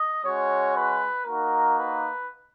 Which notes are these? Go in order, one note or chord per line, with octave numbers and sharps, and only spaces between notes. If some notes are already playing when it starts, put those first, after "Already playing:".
Already playing: D#5
G#3 C#4 F#4 C#5
B4
A#3 D#4 F#4 A#4
B4